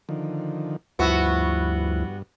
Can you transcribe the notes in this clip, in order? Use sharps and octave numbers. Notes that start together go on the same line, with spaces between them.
D3 D#3 F3
D2 G2 F3 B3 E4 F#4 E6